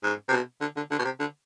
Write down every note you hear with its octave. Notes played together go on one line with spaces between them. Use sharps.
G#2
C3
B2
D3
D3
D3
B2
C3
D3